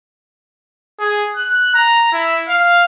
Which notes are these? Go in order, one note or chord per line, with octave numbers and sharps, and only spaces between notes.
G#4
F#6
A#5
E4
F5